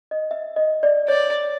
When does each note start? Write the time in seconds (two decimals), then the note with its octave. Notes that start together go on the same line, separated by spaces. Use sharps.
0.11 D#5
0.31 E5
0.56 D#5
0.83 D5
1.08 C#5 D5